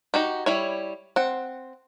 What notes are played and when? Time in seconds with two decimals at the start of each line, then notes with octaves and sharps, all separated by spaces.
0.14 D#4 F#4 G4
0.46 G3 E4 C#5
1.16 C4 F#5